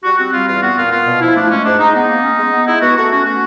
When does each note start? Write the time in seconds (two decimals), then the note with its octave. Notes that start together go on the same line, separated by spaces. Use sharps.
0.04 G3 F#4
0.18 C4 F#4
0.33 G3 F4
0.47 E2 F4
0.62 B3 F#4
0.77 A#2 F4
0.91 B3 F4
1.06 B2
1.20 F3 E4
1.35 A3 D4
1.50 G#3 C#4
1.64 G#2 D4
1.79 G#3 D#4
1.94 B3 D#4
2.08 A#3
2.23 C#4
2.37 G#3
2.52 B3
2.66 G#3 E4
2.81 B3 F#4
2.96 A3 F#4
3.11 C#4 F#4
3.25 A3 F#4